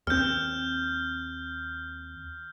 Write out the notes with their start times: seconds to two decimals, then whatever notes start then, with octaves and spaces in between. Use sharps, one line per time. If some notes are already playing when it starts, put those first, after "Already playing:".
0.07 D#2 C4 F6 G6